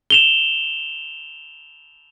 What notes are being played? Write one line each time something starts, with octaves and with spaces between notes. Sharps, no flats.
E7 F7 G7